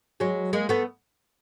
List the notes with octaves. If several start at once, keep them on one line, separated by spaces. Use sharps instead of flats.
F#3 G#3
G#3 A#3
A3 B3